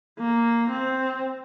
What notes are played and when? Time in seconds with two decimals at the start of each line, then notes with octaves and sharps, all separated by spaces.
0.19 A#3
0.69 C4